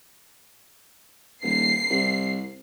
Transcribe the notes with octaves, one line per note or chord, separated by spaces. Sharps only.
D#1 C7
C2